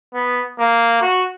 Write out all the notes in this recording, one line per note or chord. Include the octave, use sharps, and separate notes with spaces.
B3
A#3
F#4